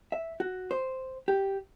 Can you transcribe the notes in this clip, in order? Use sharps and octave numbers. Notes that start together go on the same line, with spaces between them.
E5
F#4
C5
G4